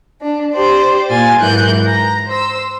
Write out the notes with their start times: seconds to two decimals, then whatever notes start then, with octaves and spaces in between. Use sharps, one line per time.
0.21 D4
0.52 G4 C5 D5
1.09 A#2 F4 G#5 A6
1.40 G#2 E3 F#3 A#4 F#6 G6
1.85 A#5
2.27 C5 E6